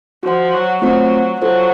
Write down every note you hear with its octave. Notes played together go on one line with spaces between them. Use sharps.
F3 F#4 C5 F#5
F#3
F#3 A3 C4 F4 C5
F#3 F4 A4 C5